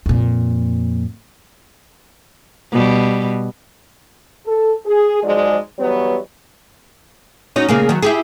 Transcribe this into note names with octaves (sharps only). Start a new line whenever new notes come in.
F2 A#2
B2 G3
A4
G#4
G#2 F3 F#3 G#3 G#4 D5
E3 F#3 G3 B3 C#5
C#4 D#4 F#4
C#3 A#3 G#4
D#3 F#3
E4 G4 G#4